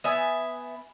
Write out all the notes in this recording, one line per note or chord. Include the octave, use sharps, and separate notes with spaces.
B3 E5 G#5